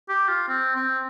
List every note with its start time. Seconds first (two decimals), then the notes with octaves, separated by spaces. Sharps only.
0.09 G4
0.28 F4
0.48 C4
0.76 C4